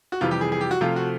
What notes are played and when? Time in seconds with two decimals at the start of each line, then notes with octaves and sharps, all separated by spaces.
0.12 F#4
0.21 F2 C3 E3 G3 F4
0.31 G4
0.41 G#4
0.52 G#4
0.61 G4
0.71 F#4
0.81 C3 F3 A3 F4
0.96 F#4